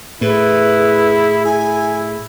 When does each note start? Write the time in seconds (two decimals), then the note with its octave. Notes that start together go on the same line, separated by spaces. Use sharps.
0.21 A2 E4 G#4 B4
1.45 E4 G#5